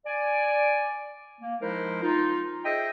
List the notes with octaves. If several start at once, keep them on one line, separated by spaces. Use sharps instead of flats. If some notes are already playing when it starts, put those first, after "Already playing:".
D5 G#5
A#3
F3 G#3 D#4 E4 A#4 C5
D#4 F4
G#4 C5 D#5 E5 G5